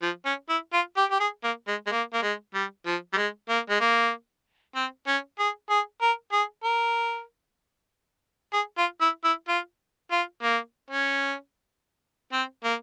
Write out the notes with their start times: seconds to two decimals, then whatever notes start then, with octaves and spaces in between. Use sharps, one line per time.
0.03 F3
0.26 C#4
0.49 E4
0.73 F4
0.97 G4
1.11 G4
1.20 G#4
1.44 A#3
1.68 G#3
1.87 G#3
1.92 A#3
2.14 A#3
2.23 G#3
2.54 G3
2.86 F3
3.13 G3
3.17 G#3
3.49 A#3
3.70 G#3
3.81 A#3
4.75 C4
5.07 C#4
5.39 G#4
5.70 G#4
6.02 A#4
6.33 G#4
6.64 A#4
8.53 G#4
8.78 F4
9.01 E4
9.24 E4
9.48 F4
10.12 F4
10.43 A#3
10.91 C#4
12.33 C4
12.64 A#3